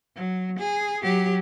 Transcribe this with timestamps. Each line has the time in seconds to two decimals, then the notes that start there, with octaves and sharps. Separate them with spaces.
0.16 F#3
0.59 G#4
1.02 F#3 G4